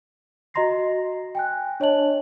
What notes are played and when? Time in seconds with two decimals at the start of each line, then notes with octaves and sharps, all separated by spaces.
0.54 F#4 D#5 A#5 C6 A#6 C7
1.35 G5 G#5 F#6
1.80 D4 C#5 D#5 A5 F#7